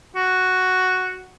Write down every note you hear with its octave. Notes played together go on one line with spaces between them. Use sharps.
F#4